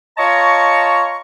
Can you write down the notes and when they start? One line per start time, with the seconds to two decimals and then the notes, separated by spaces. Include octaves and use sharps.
0.18 F4 C#5 D#5 A5 A#5 C#6